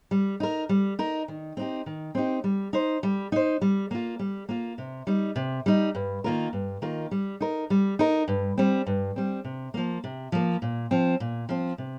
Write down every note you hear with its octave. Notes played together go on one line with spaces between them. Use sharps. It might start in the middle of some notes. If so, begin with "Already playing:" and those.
G3
D#4 A#4
G3
D#4 A#4
D#3
C4 D#4 G4
D#3
C4 D#4 G4
G3
D#4 C5
G3
D#4 C5
G3
A#3 F4
G3
A#3 F4
C3
G3 D#4
C3
G3 D#4
G2
D#3 A#3 F4 A#4
G2
D#3 A#3 F4 A#4
G3
D#4 A#4
G3
D#4 A#4
G2
G3 C4
G2
G3 C4
C3
F3 A#3
C3
F3 A#3
A#2
F3 C4
A#2
F3 C4
C3